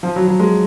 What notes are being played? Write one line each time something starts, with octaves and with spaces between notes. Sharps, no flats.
F3
F#3
F#3
G#3